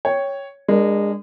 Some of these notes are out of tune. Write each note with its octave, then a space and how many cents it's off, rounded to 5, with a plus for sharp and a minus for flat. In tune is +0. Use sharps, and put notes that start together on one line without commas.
C#5 +0 G5 +0
G#3 -25 D4 +0 A#4 +0